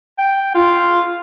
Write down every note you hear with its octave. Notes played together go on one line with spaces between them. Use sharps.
G5
F4